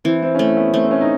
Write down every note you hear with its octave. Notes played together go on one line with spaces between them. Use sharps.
E3 C4
C4
C#4
A3 C4
B3
A3 C4
C4
C#4
D#4